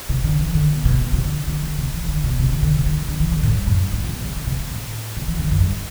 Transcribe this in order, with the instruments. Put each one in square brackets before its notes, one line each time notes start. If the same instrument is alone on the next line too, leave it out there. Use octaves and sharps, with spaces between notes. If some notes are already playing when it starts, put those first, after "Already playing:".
[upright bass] C3
D3
E3
D3
B2
B2
B2
C3
D3
D3
D3
C3
E3
D3
B2
C3
D3
D3
C3
D3
E3
D3
E3
D3
A2
G2
F#2
G2
A2
C3
B2
C3
D3
C3
B2
A2
C3
E3
D3
F#2
G2